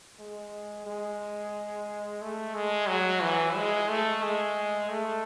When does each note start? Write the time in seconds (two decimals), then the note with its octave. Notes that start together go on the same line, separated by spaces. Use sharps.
0.19 G#3
0.86 G#3
2.21 A3
2.55 G#3
2.88 F#3
3.22 E3
3.56 G#3
3.89 A3
4.22 G#3
4.90 A3